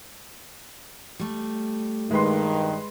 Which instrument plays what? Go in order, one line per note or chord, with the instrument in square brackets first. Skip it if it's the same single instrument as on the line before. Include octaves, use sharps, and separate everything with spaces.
[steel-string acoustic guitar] G3 A3
[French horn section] G2 D#3 [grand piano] G#3 B4 C6